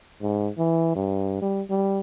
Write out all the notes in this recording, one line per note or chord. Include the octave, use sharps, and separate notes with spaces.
G#2
E3
G2
G3
G3